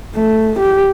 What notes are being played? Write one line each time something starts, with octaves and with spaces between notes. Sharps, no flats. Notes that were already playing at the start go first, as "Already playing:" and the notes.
A3
G4